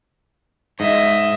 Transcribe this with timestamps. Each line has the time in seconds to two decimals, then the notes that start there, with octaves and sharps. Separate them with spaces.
0.80 G#2 D#5 E5